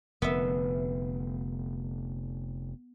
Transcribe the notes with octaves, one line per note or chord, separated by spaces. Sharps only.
F1 D3 B3 E5